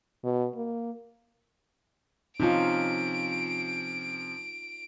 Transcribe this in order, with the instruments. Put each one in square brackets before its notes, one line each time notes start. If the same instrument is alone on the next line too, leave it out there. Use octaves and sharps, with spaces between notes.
[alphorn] B2
A#3
[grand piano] C3 F3 C#4 [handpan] D#4 F4 [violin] D7